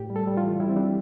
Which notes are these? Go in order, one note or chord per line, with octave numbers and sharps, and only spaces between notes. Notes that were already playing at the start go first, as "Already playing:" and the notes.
Already playing: A2 G4
G3
A4
G3
F4
E3
G3 E4
C4
G3 D4